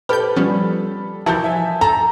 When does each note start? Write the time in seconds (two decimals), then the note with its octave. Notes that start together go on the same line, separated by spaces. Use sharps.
0.09 G4 A4 B4 B5 F6 G6
0.36 F3 G3 B3 C#4
1.26 E3 F3 E4 F#4 A#4 A5 G6
1.44 E5 G#5
1.81 A4 A#5